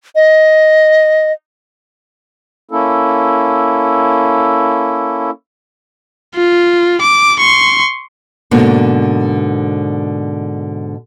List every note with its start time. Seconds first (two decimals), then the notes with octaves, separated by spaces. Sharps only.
0.15 D#5
2.71 A#3 C#4 E4 A4
6.35 F4
7.01 D6
7.39 C6 C#6
8.51 G#2 B2 D3 A#3